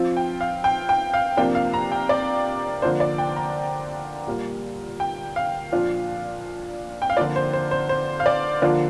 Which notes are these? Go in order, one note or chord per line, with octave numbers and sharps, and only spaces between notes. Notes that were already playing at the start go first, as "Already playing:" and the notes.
Already playing: F3 C4 F4
G5
F5
G5
G5
F5
C3 F3 A#3 D4 F4 G5
F5
A#5
G5
D5
D3 F3 A#3 D4 C5
D5
G5
A#5
A#2 G3 A#3
G5
F5
A#2 F3 D4 F4
G5
F5
D3 F3 A#3 F4 D5
C5
C5
C5
C5
F5
D5
D3 F3 A#3 D4 F4 D5